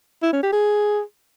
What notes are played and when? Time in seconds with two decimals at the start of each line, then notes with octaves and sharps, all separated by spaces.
0.23 E4
0.33 C#4
0.43 G4
0.53 G#4